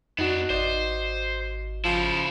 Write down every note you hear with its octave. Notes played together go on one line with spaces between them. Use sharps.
F2 B3 D4 D#4 F#4
G#1 C5 D5 D#5
C#3 F3 E4